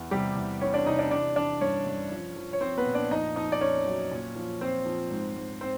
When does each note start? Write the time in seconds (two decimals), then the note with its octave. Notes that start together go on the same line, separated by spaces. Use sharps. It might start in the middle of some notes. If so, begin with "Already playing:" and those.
Already playing: E2
0.11 C3 G3 G4
0.36 E2
0.61 E2 C#4 C#5
0.74 D4 D5
0.86 C3 D#4 D#5
0.99 D4 D5
1.11 E3 D4 D5
1.36 E3 D4 D5
1.61 G2 C#4 C#5
1.87 G2
2.11 F3
2.36 F3
2.53 C#5
2.61 F3 C4 C5
2.78 B3 B4
2.86 A#2
2.95 D4 D5
3.11 F2 D#4 D#5
3.36 F2 D#4 D#5
3.52 D5
3.61 F2 C#4 C#5
3.86 F#3
4.11 A#2
4.36 F3
4.61 F3 C4 C5
4.86 F3
5.11 G#2
5.36 G#2
5.61 C4 C5